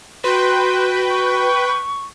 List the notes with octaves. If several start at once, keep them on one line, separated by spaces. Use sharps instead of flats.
F#4 B4 G5 C6
C#6